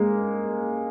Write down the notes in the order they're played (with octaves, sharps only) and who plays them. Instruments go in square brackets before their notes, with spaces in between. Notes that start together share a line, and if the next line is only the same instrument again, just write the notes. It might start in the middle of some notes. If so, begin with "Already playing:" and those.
Already playing: [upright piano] G#3 A#3